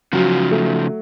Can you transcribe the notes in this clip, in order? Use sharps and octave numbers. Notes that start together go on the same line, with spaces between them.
C#3 F3 F#3
A3